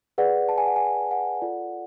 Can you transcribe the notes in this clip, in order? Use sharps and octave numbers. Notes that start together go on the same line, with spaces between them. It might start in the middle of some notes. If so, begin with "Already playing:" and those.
G#4 B4 D5 F#5
A5
G#5
F#5
G#5
F#5
F4 A4 D5